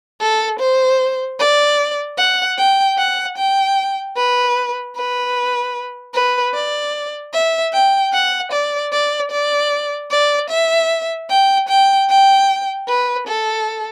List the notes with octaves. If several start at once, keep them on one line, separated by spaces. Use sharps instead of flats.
A4
C5
D5
F#5
G5
F#5
G5
B4
B4
B4
D5
E5
G5
F#5
D5
D5
D5
D5
E5
G5
G5
G5
B4
A4